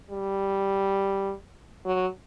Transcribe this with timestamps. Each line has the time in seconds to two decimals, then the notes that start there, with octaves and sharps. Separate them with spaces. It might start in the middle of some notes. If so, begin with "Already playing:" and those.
0.11 G3
1.86 F#3